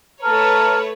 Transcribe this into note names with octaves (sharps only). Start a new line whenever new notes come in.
A3 B4 C#5 A5 A#5 F6